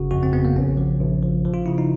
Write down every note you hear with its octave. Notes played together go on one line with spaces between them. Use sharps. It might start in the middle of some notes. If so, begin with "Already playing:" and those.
Already playing: G1 C#3 F#4
F2 F#4
C4
C#3 B3
A#3
A#1 C#4
F3
A#1
F3
F3
F4
C#3 E4
D#4